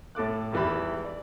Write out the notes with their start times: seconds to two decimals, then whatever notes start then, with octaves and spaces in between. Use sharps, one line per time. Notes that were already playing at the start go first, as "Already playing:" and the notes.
0.15 A2 A4 D6 F#6
0.52 G#1 E2 E3 G4 B5
1.05 D5